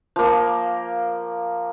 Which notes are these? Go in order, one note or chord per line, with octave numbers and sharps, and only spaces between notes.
F3 A#3